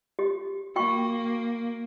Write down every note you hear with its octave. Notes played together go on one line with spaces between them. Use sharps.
G4
A#3 F#4 G5 C#6